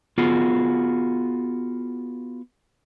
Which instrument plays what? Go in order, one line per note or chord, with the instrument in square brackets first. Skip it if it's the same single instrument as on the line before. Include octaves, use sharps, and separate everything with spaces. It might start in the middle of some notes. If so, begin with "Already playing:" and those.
[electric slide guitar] B3 F4 F#4 G#4